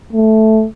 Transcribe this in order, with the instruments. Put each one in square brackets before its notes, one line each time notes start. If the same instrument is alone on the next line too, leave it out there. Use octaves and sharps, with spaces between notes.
[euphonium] A3